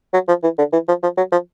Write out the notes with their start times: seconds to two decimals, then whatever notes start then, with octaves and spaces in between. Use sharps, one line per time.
0.13 F#3
0.28 F3
0.43 E3
0.58 D3
0.73 E3
0.88 F3
1.03 F3
1.17 F#3
1.32 F3